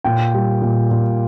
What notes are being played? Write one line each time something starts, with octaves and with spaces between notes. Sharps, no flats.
A#2 G5
G3
A#2
A#2